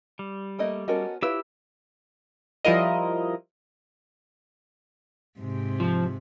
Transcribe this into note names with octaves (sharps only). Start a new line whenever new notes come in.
G3
A3 A#3 D#5
B3 C#4 F#4 A4 A#4 D#5
E4 F4 G4 B4 C#5 E6
F3 G3 E4 F4 A#4 D#5
G#2 C3
F3